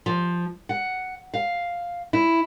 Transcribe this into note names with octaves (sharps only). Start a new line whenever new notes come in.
F3
F#5
F5
E4